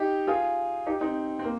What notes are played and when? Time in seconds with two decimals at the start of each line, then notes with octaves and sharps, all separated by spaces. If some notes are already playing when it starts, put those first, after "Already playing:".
Already playing: D#4 G4
0.27 F4 G#4
0.86 D#4 G4
1.01 C4 D#4
1.39 C4
1.44 A#3